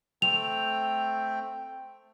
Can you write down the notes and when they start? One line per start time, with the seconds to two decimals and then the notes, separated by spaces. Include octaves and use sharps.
0.22 A3 C4 G5 F7